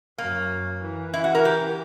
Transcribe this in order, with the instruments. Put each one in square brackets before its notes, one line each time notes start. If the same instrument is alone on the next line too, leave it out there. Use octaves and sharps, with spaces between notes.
[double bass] F#2 [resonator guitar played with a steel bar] A#3
[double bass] E3
[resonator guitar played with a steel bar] E4
F#4
A#4
G4